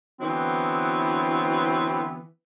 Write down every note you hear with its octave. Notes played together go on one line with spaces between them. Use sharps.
D3 E3 F#3 B3 C4 E4